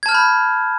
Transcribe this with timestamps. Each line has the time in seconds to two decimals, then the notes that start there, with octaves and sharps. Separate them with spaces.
0.03 G#6
0.06 A5
0.09 F6
0.12 G6
0.15 B5